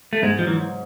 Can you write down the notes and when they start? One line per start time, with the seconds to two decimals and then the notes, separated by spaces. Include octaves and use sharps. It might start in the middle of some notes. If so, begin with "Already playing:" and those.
0.13 A3
0.23 G#2 G#3
0.39 F3
0.47 E3 F#3